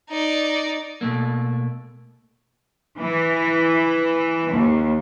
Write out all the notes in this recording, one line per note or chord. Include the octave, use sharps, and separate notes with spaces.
D#4 D5
B2 A3 A#3
E3
D#2